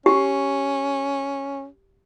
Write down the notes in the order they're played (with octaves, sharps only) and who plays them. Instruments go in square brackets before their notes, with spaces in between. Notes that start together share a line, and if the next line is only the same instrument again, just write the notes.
[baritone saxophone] C#4 [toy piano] G4